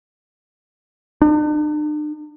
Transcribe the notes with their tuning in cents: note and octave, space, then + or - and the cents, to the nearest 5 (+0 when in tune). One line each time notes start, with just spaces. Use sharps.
D4 +45